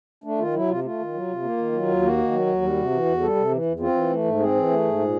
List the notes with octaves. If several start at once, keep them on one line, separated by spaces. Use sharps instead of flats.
A3 D4
D#3 F4
F#3 E4
C3 F4
A3 F4
D#3
F#3
C3
A#3
D#3
F#3
D#2
A#3 F#4
D#3
F#3
D#2
G3
C3
E3
E2
G3 A4
C3
E3
E2
C4 F4
E3
A3
G#2
C4 G#4
E3
A3
G#2
A#2